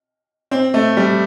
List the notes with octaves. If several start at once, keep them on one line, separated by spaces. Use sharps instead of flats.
C4
A3
G3